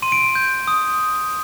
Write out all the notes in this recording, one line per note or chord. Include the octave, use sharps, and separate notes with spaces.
C6 D#7
D7
D#7
G6
D#6